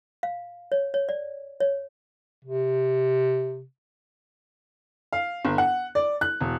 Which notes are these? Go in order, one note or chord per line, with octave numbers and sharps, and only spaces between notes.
F5
C#5
C#5
D5
C#5
C3
F5
G1
F#5
D5
F#6
E1